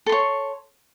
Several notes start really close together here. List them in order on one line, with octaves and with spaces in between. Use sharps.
A4 C6 C#5